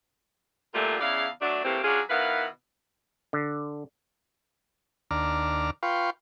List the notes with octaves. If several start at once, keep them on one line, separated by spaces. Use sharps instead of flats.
F#2 A#2 D3 G3 A3 F4
E2 C#3 E4 D5 F5
F#3 A3 D4
G#2 E3 A3 A#3 C4 G4
F#3 C#4 D4 F4 G#4
B2 D#3 E4 B4 F5 F#5
D3
D#2 D4 A#5 D6 F6
F4 B4 F5 G5 C6 C#6